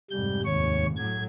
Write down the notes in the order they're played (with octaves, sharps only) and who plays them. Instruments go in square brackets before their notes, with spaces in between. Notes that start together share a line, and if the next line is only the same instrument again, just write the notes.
[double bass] F1 G#2 [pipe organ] G3 G6
[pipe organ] D#2 C#5 C#6
[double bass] A2 F#3 [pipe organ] G#6